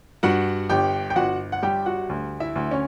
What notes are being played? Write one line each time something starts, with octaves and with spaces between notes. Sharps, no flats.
G2 F#4 F#5
G1 G4 G5
G5
G1 F#4 F#5
F#5
G3 G4 G5
F#4 F#5
D2
E4 E5
D2
C#4 C#5